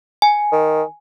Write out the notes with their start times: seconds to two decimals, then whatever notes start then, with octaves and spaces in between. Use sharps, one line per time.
0.22 G#5
0.52 D#3